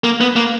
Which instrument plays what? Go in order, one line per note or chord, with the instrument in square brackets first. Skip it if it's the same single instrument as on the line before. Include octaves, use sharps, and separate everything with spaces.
[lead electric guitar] A#3
B3
A#3